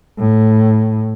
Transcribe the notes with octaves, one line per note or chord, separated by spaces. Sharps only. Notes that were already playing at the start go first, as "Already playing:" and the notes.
A2